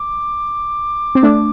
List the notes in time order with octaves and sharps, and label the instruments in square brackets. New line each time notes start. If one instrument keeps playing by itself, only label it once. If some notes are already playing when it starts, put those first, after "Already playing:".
Already playing: [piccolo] D6
[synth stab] C4
A3 D4